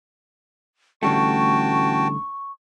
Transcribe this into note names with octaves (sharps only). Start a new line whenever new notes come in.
A1 D3 G3 A3 F#4 G5 A5 C#6